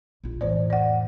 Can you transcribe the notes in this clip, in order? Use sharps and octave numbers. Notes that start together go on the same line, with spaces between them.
A#1 F4
F2 A2 E3 C5 D5
D5 F#5